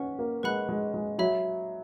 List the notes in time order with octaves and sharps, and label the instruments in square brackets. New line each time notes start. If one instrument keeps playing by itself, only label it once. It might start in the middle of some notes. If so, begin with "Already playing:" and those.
Already playing: [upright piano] C#4 [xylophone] B4 F#5
[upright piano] A#3
[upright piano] G#3 [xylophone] B4 F#5 B5 F#6
[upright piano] G#3
G#3
[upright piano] F#3 [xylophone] C#5 E5 B5